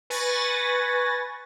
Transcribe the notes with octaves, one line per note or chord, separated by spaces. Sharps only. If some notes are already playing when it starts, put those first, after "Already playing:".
B4 G#5 C#6 A6 A#6